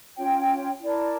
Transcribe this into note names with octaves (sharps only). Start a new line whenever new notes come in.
C#4 F4 C#5 G5
E4 A#4 D5 A5